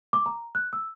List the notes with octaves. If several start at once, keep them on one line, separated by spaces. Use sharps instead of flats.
D6
A#5
F#6
E6